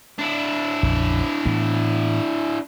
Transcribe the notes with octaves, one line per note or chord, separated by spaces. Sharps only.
D4 E4
A#1 F2 C#3
A2 E3 B3